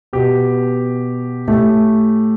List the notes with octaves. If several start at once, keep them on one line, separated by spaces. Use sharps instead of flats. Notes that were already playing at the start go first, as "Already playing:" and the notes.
B2 B3 G4
A2 A3 G4